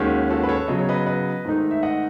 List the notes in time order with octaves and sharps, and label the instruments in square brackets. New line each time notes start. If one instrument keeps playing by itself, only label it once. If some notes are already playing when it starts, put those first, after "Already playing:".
Already playing: [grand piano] D#2 D#3 G#3 C#4 F#4
F#4 A4
B4
A4 C#5
C#3 F#3 B3 D#5
C#5
B4 D#5
B4 D#5
G#2 D#3 A3 D#4
E5
D#5 F#5